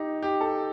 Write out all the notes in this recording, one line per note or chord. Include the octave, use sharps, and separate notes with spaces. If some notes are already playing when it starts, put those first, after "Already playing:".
Already playing: D#4 G4
G4
A4